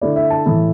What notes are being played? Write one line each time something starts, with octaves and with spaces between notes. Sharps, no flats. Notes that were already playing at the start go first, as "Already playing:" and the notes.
D3 A3 E4 D5
E5
A5
A2 E3 A3 E4